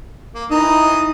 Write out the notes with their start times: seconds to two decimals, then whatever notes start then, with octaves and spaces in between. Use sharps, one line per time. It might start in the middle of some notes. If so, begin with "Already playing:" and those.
0.35 A#3
0.51 E3 D#4 A#5 D#6